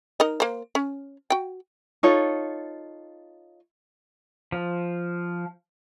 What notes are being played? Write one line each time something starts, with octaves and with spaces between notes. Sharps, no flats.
D#4 A#4 D#5
A#3 C5
C#4
F#4 G5
D#4 F4 A4 C#5
F3